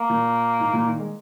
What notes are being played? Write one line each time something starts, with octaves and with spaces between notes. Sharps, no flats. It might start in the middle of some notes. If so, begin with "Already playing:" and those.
Already playing: A#3
A#2
G#2
A#2
D#3
G#3